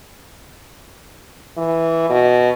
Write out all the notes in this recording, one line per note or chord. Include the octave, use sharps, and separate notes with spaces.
E3
B2